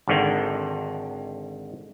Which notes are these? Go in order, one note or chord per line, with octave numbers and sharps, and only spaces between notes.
G#1 G#2 D3 D#3